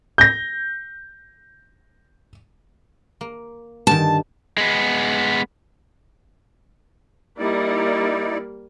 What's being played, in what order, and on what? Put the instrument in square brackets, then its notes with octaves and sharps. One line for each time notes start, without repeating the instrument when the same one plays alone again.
[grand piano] G6 A#6
[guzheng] A#3
[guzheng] G2 D3 D#3 [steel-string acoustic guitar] A5
[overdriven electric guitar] G#3 B3
[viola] G3 A#3 [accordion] D#4 E4 D5